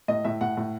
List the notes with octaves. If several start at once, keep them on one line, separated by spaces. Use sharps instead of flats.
A2 D#5
A2 E5
A2 F#5
A2